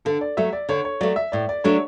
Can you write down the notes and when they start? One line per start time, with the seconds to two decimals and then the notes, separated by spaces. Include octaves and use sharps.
0.05 D3 A4
0.21 D5
0.37 F#3 A3 E5
0.53 D5
0.69 D3 C#5
0.85 C#5
1.01 F#3 A3 D5
1.16 E5
1.32 A2 D5
1.49 D5
1.64 F#3 A3 D4 C#5